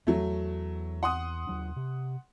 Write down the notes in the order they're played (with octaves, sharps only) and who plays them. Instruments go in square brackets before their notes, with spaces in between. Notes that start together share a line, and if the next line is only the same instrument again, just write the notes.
[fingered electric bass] E2 [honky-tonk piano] F#3 A3
[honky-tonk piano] F#5 C6 D#6
[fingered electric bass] D#2 F#3 D4
C3